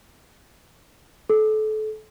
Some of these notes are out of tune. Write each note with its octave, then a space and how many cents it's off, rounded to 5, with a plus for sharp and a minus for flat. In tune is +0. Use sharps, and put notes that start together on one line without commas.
A4 -30